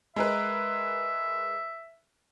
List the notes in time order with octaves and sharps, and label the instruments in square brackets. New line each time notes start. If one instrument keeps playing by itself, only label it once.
[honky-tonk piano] G#3 A#4 B4 [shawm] E5